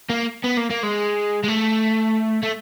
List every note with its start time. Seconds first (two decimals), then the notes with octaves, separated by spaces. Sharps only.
0.10 A#3
0.44 B3
0.58 A#3
0.70 A#3
0.83 G#3
1.43 G#3
1.48 A3
2.43 A3